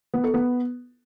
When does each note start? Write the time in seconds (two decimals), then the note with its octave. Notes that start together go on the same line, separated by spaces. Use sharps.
0.14 B3
0.24 A4
0.34 B3